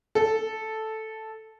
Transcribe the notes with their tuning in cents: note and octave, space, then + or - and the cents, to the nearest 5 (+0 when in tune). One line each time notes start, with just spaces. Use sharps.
A4 -5